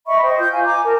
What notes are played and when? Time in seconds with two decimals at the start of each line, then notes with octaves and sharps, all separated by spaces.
0.07 D#5 E5 B5 C#6
0.22 C5 D#5 G5
0.38 F4 G6
0.51 F5 G#5
0.65 G#5 A#5 D6
0.84 A#4 A5